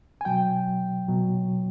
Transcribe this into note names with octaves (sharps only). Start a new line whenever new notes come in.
G#5
B2 F#3 G5
B2 F#3